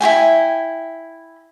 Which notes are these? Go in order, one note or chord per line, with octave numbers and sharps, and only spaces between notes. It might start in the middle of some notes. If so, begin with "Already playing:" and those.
E4 F#4 G5 G#5